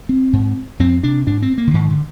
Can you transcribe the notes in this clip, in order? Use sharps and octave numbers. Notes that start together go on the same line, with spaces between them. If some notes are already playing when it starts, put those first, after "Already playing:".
C4
G#2
F2 C4
C3 D4
G#2 D4
C4
A#3
D3
G#2 D#3
D3